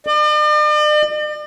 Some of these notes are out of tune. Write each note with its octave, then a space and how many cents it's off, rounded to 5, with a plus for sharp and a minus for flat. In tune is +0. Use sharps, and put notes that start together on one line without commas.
D5 +45